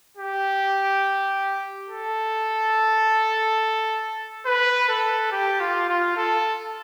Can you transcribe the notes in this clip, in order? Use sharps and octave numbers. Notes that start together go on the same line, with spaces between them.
G4
A4
B4
A4
G4
F4
F4
A4